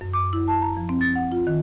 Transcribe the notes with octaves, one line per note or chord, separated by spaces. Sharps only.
F#2
D6
E4
A5
A#5
F3
C4
A6
F#5
F4
D#3